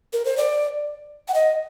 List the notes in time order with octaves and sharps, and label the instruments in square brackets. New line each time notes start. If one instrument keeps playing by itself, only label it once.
[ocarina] A#4
C5
D5
F#5
D#5